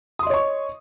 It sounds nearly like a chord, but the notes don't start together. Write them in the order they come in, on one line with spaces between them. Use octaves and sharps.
D#6 C6 D#5 C#5 C#6